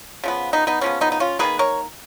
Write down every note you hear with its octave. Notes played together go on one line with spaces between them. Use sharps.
C#3 F3 B3
B3 D#4
B3 D#4
C#3 F3 B3 C#4
B3 D#4
D#4
C#4 F4
D#3 F#3 A#3 G#4 B4
A#4 C#5